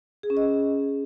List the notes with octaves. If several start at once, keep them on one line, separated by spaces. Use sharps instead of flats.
G#4
C#4
D#5